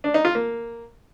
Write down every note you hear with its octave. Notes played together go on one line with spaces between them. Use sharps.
D4
D#4
F4
A#3